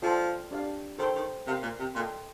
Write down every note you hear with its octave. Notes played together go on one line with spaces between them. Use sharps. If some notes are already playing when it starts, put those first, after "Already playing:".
F3 F4 A4 D5 G5
D4 G4 D5 F5
D#3 A4 C5 G5 C6
D#3
C3 A#4 F5 C6
A#2
C3
A#2 A4 D#5 G5 C6